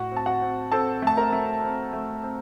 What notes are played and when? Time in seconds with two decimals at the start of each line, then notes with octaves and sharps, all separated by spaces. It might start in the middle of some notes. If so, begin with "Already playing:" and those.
Already playing: A2 F#4 F#5
0.11 C4
0.17 A5
0.26 F#4 F#5
0.41 C4
0.72 C4 A4 A5
1.02 A3 A5
1.17 A#4 A#5
1.33 A3
1.63 C4
1.93 A3
2.23 C4